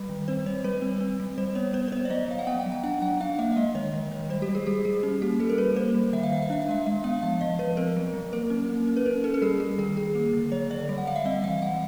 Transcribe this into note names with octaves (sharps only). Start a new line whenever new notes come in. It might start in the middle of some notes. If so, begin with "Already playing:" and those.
Already playing: G3 B4
D#3
C4 C5
G3 C#5
G3 B4
C4
C4
G3
G3 C5
B3 C#5
B3 C5
C5
B3 C#5
D5
F#3 D#5
F#3 F5
F#5
B3 G5
G5
F#3
G5
D4 F#5
F#3 F#5
D4 F5
A#3 E5
E5
G#3 D#5
D#3 C#5
D#3
D#3
G3 C5
G4
G3
G#4
G3 G4
G3 G#4
C#4
A#3 G4
G3 A4
A#4
G3 B4
A#3 C5
G3
D#3 E5
F5
D#3 E5
F5
D4 E5
F5
G#3 E5
G#3 E5
B3 F5
F3 F5
F3 D#5
F3 B4
C4 A#4
F#3
F#3
A#3 A#4
C#4
A#3
C#4
B4
C#4 A#4
C#4 A4
A4
G3 G#4
G3 G#4
D#3 G#4
D#3 G#4
A#3
D3
F#3 C#5
D3 D5
G3
F#5
G3 F5
E5
C4 D#5
E3 F5
G3 F#5